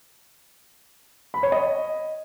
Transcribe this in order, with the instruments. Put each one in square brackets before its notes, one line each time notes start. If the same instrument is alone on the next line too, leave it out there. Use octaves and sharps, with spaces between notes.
[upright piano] B5
C#5
D#5